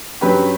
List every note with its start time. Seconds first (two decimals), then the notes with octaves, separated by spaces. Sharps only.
0.21 G2 F#3 C#4 G4 B4